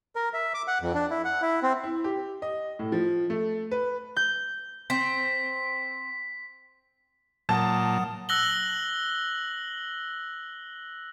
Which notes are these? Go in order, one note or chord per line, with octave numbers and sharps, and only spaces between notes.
A#4
E5
D6
F#5
F2
D4
E4
F#5
E4
C4
E4
G4
D#5
A2
F3
A3
B4
G6
C4 B6
A#2 F#3 F#5 A5 D#6
E6 F#6 A#6 F#7 G7